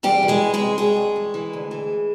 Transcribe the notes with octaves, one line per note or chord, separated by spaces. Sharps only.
E2 G3 G4
E3
G#3 G#4
E2
G#3 G#4
C3
G2 G#3 G#4
G2
E3
E3
D2
E3